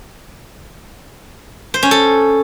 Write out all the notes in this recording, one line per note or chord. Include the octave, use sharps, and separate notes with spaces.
C5
C#4
A4